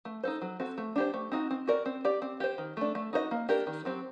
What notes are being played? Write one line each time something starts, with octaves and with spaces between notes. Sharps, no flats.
A3
D#4 A4 C5
F#3
C4 F#4 A4
A3
D4 G4 C5
A3
C4 D#4 F#4
C4
F#4 A#4 D5
C4
G4 D5
C4
G4 C5
D#3
A3 D4
A3
D#4 F#4 C5 D#5
A#3
D4 G4 A#4
D#3
F#3 C4 G4